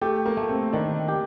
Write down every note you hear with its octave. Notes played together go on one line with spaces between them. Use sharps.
A3 G4
A#3
A3
C4
D#3 D4
G4